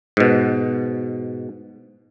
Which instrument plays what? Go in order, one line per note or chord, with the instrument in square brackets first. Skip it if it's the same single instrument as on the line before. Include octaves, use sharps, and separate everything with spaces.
[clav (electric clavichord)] G#2 B2